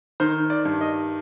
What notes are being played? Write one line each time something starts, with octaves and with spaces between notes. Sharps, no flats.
D#3 C5
D5
G2
D#5